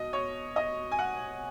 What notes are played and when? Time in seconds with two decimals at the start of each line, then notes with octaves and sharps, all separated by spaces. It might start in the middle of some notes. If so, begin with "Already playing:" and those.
Already playing: B2 D#5
0.13 C#5
0.56 D#5
0.92 G#5
0.99 F#5